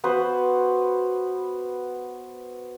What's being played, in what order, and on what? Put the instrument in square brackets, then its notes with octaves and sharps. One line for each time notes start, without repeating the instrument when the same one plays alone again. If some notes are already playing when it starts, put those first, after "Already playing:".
[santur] B3 F#4 B4 C5